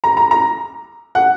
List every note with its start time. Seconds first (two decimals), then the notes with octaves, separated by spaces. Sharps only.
0.04 A#5
0.17 A#5
0.31 A#5
1.15 F#5